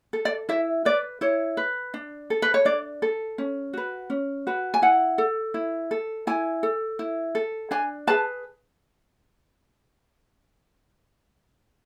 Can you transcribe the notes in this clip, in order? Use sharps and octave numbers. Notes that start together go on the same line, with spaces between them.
A4
D5
E4 E5
B4 D5
E4 C#5
B4
D4
A4
B4
C#5
D4 D5
A4
C#4
F#4 B4
C#4
F#4 B4
G#5
E4 F#5
A4
E4
A4
E4 G#5
A4
E4
A4
D4 G#5
G#4 B4 A5